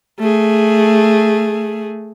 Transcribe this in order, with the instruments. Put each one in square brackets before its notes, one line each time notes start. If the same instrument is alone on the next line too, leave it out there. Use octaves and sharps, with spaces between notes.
[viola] A3 G#4